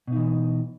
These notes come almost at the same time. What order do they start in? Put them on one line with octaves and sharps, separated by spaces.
B2 D#4 E3